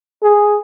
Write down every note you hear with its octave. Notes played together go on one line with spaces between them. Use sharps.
G#4